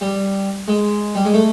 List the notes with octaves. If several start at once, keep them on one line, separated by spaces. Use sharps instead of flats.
G3
G#3
G3
G#3
A3